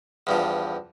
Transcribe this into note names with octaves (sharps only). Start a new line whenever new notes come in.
E2 G2 F3